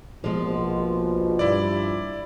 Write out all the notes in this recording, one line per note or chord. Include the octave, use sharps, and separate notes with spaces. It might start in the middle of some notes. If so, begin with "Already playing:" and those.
A#1 B2 F3 G#3
G2 E4 D5